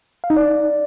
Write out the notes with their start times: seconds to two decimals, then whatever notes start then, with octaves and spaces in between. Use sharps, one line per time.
0.24 F5
0.30 D#4
0.37 D5